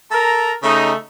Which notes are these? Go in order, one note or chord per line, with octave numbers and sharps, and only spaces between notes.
A4 A#4 A#5
C#3 A3 D#4